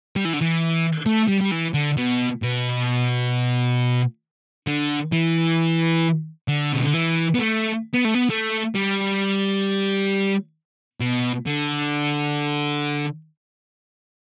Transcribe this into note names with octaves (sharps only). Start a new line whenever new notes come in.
G3
E3
D3
E3
A3
G3
G3
E3
D3
B2
B2
D3
E3
D3
B2
D3
E3
B3
A3
B3
A3
B3
A3
G3
B2
D3